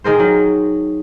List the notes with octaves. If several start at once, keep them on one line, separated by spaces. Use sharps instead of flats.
D#3 G#4 A#4 C5
F#3